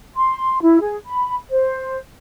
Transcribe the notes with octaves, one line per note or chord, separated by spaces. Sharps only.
C6
E4
G#4
B5
C5